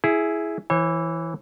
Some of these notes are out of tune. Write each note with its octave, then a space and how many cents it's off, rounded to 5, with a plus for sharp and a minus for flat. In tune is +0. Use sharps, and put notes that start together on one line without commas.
E4 +0 G#4 +10
E3 +0 C#5 -40